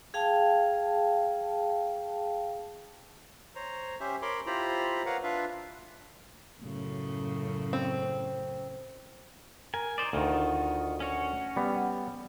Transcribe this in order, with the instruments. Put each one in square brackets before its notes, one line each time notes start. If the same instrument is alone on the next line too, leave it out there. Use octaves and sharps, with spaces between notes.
[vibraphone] G#4 F5 G5 A5
[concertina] C5 C#5 A#5
C#4 G4 C5 E5
A#4 C#5 B5 C6 D6
E4 F4 G4 C5 A#5 B5
A#4 B4 C#5 F5 F#5 A#5
D4 F4 B4 E5 F5
[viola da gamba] F#2 A2 C#3
[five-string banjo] C4
[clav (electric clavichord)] A#4 [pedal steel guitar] G#5
[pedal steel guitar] D#4 C5 D5
[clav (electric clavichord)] D2 D#3 [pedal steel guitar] D#4 F4 F#4
[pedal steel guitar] C#4 F#4 C#5
[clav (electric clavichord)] G3 B3